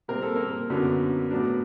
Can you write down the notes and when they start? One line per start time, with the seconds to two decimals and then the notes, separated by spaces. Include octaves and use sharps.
0.08 A#2 G3 C4 A#4
0.22 A4
0.36 A#3 A#4
0.70 F#2 D3 F#3 B3 D4
1.31 A2 F#3 B3 D4